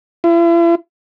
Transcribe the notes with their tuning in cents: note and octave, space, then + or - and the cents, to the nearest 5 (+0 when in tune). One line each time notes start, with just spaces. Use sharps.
E4 +45